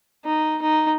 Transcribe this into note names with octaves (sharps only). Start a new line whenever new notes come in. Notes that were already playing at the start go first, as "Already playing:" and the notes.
D#4
D#4